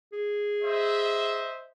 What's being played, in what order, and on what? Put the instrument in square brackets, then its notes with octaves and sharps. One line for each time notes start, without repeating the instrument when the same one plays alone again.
[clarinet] G#4
[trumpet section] C5 D#5 E5